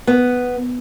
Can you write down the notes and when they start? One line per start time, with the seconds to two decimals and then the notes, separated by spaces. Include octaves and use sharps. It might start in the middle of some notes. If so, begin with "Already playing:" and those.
0.07 B3